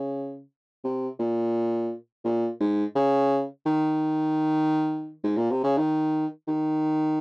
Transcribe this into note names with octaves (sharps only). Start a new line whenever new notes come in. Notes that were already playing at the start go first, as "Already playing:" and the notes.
Already playing: C#3
C3
A#2
A#2
G#2
C#3
D#3
G#2
A#2
C3
C#3
D#3
D#3